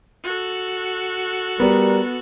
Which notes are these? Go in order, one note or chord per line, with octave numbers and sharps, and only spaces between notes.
F#4 A4
G3 B3 A#4